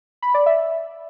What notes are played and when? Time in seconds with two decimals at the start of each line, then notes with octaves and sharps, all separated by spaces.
0.22 B5
0.34 D5
0.46 E5